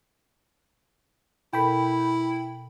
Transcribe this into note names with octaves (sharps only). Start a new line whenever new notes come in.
B2 E4 A4 A#4 G5 B5